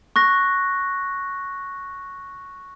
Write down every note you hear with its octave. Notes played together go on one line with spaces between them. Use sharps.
C#6 F#6 A#6